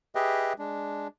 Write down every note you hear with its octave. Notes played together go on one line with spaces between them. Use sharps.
G4 G#4 B4 D#5 E5 G5
G#3 D4